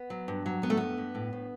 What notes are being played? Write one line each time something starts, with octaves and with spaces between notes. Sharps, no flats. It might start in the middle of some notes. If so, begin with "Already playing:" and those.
Already playing: B3
F#3
G2
F#3
G2 B3
A3
G2 B3
G2
A2
A2